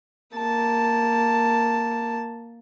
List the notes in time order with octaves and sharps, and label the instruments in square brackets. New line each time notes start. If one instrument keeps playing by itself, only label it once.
[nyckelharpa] A#3 A5